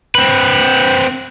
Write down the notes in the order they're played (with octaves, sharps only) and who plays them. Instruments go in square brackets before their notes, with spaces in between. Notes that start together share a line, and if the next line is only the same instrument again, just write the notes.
[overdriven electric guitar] C4 B4